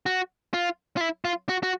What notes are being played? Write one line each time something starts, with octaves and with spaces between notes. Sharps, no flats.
F#4
F4
F4
E4
F4
F#4
F#4